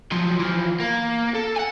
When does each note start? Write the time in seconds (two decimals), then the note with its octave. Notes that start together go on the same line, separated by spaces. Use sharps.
0.12 F3 F#3
0.39 E3 F3
0.80 A#3
1.35 A4
1.56 F#5 G#5